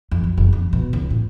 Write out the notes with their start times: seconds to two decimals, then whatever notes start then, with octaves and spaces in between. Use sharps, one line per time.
0.11 F2
0.24 F#2
0.38 F#1
0.53 F2
0.73 B2
0.93 C#2
1.10 A2